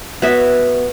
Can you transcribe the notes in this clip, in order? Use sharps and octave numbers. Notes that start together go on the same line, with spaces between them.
B3 F#4 C#5 E5